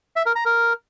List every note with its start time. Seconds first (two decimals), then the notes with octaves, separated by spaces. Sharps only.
0.16 E5
0.26 A#4
0.36 A#5
0.45 A#4